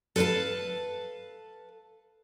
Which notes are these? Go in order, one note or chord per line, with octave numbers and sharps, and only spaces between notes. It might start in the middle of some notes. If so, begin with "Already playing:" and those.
A4 B4 C5 F5 A5